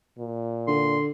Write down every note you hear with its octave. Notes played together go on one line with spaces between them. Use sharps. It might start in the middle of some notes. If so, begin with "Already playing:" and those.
A#2
D3 C6